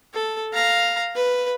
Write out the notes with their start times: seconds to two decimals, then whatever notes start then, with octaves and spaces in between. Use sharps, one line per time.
0.14 A4
0.53 F5 A#5
1.15 B4